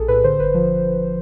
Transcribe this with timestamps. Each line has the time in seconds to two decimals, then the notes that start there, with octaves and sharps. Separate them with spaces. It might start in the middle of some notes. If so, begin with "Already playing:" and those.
Already playing: A#1 G#4 A4
0.08 A2 B4
0.24 D3 C5
0.39 G1 B4
0.54 F3